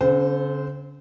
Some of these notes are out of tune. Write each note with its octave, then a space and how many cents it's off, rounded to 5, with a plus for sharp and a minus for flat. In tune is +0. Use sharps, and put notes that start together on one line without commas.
D3 -45 C4 +20 C5 -20